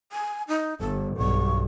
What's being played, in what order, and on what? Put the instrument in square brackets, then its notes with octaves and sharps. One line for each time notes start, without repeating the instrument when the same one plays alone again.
[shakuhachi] G#5
D#4
[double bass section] G1 [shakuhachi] A4
[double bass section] B1 G2 [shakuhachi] C#6